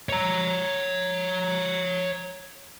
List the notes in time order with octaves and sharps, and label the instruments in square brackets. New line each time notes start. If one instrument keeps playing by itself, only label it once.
[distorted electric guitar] C#5 A#5